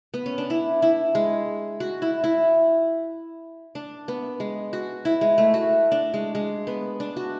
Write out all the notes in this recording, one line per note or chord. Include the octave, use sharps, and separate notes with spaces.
B3
C#4
D4
E4
E4
G#3
F#4
E4
E4
D4
B3
G#3
F#4
E4
G#3
A3
F#4
D4
G#3
G#3
B3
D4
F#4